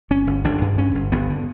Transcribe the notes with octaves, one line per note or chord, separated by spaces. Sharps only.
G1 C#4
G1
G1 D4
G2
G2 C#4
G1
G1 B3
D3